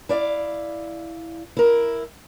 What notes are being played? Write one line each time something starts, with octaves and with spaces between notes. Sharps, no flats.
E4 D5 F5
E4 A#4